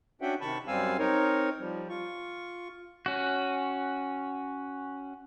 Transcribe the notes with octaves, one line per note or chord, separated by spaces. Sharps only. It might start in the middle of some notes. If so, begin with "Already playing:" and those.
C#4 D4 F#4 E5 F#5 G5
C3 D#3 A5 B5 C#6
F#2 G3 C4 F5 G#5 E6
C4 D#4 A#4 C#5
F3 G3
F4 C#6
C#4 F#4